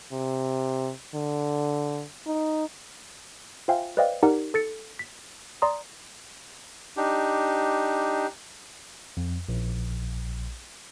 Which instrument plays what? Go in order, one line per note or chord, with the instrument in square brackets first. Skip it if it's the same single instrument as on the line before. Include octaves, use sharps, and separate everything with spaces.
[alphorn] C3
D3
D#4
[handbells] F4 C5 E5 F5 G5 G#5
B4 C5 D5 D#5 F5 G5
D#4 G4 A#4 D5 F#5
A4 A6 C#7
B6
D5 A#5 C6 D#6
[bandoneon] D4 D#4 G4
[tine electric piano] F2
A#1